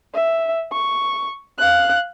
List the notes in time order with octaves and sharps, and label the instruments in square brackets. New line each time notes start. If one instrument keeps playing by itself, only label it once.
[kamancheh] E5
C#6
F5 F#6